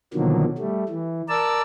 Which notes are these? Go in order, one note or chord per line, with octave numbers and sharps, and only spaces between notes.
B2 D3 D#3 F3 F#3 A#3
G3 A3
E3
A#4 D5 A5 E6